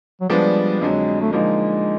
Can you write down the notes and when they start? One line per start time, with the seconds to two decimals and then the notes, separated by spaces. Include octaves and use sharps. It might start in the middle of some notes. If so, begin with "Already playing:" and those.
0.21 F#3
0.30 F3 G3 G#3 B3 D4
0.81 F2 D3 F#3 G#3
1.21 A3
1.33 D3 F3 G#3 A#3 D#4